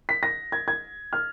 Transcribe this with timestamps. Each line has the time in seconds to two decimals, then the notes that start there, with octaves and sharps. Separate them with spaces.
0.09 B6
0.23 A#6
0.52 G#6
0.68 G#6
1.13 F6